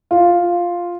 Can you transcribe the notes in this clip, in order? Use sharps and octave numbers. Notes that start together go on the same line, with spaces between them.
F4